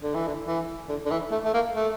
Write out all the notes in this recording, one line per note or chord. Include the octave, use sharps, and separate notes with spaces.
D3
E3
D3
E3
D3
D3
E3
A3
A3
A#3
A3